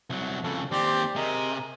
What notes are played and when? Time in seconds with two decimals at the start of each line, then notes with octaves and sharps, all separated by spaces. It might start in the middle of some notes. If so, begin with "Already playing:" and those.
0.10 C2 F#3
0.44 F2 C#3 A4
0.72 D#2 C4 G4 C5 D5
1.16 C3 G#4 A#4 D#5